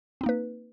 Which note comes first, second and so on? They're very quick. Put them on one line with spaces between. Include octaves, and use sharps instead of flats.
C4 D#4 A#3 B4